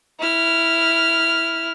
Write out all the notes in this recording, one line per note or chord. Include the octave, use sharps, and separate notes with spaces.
E4 F6